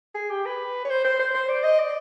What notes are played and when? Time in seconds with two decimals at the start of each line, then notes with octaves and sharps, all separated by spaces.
0.15 G#4
0.30 G4
0.46 B4
0.85 C#5
0.90 C5
1.05 C5
1.19 C5
1.34 C5
1.49 D5
1.64 D#5
1.79 D5